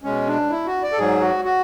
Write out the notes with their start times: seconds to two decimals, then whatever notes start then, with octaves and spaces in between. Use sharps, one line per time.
0.04 B2 G#3 C#4
0.27 D4
0.50 E4
0.66 F#4
0.83 D5
0.92 A4
0.97 G#2 F#3 G#4
1.21 F#4
1.45 F#4